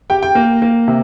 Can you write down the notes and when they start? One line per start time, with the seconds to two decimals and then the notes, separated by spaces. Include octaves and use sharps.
0.10 G4 G5
0.23 G5
0.35 A#3
0.62 A#3
0.88 C3